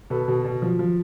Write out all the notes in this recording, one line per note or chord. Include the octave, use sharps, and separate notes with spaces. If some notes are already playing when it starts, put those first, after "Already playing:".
B2 A4 B4
B2
B2
F3
F3